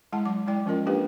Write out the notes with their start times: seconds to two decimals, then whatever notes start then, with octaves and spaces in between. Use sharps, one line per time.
0.13 G#3 E4 F#5 A5
0.25 F#3 D6
0.47 G#3 E4 D5 G5
0.66 F3 C#4 F4 A#4 D#5
0.86 A#3 D4 G4 B4 D#5 G5